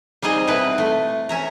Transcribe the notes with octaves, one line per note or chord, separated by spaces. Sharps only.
G3 C4 D#4 G#4 D#5
B2 C4 E4 B4
A3
C#4 E5 A#5